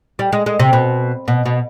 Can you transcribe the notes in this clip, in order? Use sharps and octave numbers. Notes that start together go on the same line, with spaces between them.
G3
G#3
G#3
C3
B2
B2
B2